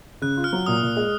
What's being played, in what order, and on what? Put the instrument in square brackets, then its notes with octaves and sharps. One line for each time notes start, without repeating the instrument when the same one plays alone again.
[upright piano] C#3 [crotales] F#6
[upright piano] F4
[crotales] F6
[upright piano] F#3
[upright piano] A#2 [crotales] D#6
[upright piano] A#2
G#3